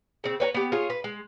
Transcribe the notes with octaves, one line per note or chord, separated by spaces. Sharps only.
C#3 C4
B4 C#5 F#5 A#5
B3 G4
F4 G#4 C#5
B4
G#3